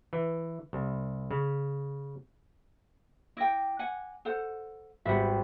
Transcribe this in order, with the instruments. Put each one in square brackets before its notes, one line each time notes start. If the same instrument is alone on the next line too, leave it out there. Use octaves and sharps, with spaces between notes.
[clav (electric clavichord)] E3
C2
C#3
[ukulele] E4 G5 [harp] D6 A#6
[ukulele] F#5 G#5
A4 C5 F#5
[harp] G#1 G3 B3 [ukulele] E5 F#5